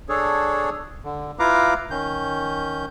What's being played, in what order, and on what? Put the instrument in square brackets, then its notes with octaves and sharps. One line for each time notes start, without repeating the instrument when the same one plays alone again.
[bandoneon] D4 G#4 A4 C#5
D3
E4 F4 B4 F5 A#5 D6
D#3 C#4 G6